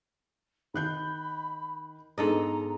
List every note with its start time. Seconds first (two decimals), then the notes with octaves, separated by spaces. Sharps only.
0.74 D#3 B5 F#6 G6
2.18 G#2 B3 D4 A4 D#5 A#5